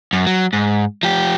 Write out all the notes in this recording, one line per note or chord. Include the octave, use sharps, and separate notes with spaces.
F#2
F#3
G#2
F3 G4